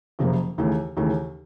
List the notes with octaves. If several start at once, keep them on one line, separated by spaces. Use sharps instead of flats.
F#1 F2 C3 F3 A#3
D#2 C#3 E3 A3
D#2 C#3 E3 A3